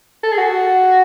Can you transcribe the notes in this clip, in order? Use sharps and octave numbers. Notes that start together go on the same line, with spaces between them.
A4
G#4
F#4